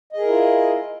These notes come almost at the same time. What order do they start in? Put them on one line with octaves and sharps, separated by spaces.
D#5 G#4 A#4 E4 F4